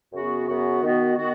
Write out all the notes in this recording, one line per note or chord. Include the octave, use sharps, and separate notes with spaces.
F#2 C#3 B3 F#4
F#2 C#3 B3 F#4
D#3 B3 F#4
D#3 B3 F#4